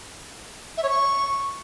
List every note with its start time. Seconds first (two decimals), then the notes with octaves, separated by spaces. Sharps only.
0.77 E5
0.83 C#5
0.89 C#6